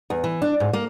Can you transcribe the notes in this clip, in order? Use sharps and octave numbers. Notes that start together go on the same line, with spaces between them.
E2
E3
D4
G#2
A#3